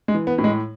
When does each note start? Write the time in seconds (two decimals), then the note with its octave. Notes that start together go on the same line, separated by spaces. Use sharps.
0.08 G#3
0.14 E3
0.27 B3
0.38 A2
0.44 G#3